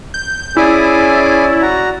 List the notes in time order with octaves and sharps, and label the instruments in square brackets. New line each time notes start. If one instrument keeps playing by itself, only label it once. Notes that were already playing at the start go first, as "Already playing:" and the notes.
[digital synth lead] G6
[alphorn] C#4 [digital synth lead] E4 [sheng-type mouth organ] G#4 G#5 D6 [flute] D5
[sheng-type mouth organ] F#4 F#5 A#5